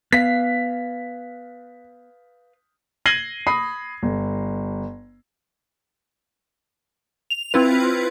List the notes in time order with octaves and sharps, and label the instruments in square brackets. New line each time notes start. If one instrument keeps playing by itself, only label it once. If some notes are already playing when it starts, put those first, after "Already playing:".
[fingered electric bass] B3 [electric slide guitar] B4 F5 [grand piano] B6
[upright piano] G#6 A#6 C7 D#7 F#7 G7
B5 D#6 C7
G1
[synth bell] F7
C4 E4 F4 B4